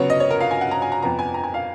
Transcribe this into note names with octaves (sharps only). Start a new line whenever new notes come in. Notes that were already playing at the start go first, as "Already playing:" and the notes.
Already playing: C#3 F#3 B3 F#4 C#5
D#5
C#5
A#4
F5
G#5
F#5
A#5
G#5
A#5
F2 F3 B3 A#5
G#5
A#5
G#5
F5